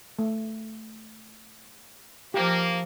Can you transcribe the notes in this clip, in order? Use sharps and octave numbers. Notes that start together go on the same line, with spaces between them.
A3
F3 A#3 G4